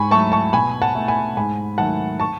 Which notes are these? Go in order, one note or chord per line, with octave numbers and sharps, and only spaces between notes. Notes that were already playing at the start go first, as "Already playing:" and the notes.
Already playing: G#2 G#5 B5 C#6
F#3 A3 A5 C#6
A5 C#6
B2 G#5 B5
F#5 A5
A3
G#5 B5
G#2 G#5 B5
D#3 F#3 A3 F#5 A5
A5 C#6